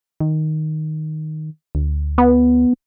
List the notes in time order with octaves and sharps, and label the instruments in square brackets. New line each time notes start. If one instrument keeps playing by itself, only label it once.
[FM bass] D#3
D2
[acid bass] B3